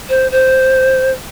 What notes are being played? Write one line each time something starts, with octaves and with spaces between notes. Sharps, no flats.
C5
C5